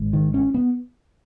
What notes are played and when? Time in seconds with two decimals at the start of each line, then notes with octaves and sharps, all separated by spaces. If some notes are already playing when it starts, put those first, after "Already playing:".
Already playing: G#1 G#2
0.13 D#3
0.34 C#4
0.54 B3